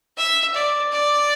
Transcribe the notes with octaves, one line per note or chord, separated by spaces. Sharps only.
E5
D5
D5